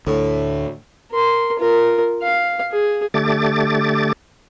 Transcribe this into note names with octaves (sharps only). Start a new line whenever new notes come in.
D2 A2
A#4 C6
F4 A#4
F5
G#4
D3 A3 G4 D6 A6